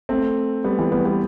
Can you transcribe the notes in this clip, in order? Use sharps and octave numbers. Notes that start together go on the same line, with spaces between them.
A3 C4
G3 B3
E3 G3
G3 B3
G3 B3